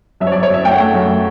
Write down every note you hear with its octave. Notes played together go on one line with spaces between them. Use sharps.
F#2 E5
C#5
D5
F#2
C#5
F#2 E5
A3 G5
F#5
A3 G5
F#2